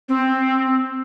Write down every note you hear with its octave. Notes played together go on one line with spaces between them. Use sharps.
C4